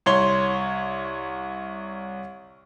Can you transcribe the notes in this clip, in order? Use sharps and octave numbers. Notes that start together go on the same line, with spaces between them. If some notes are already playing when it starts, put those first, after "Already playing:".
C2 C#5 C6 G7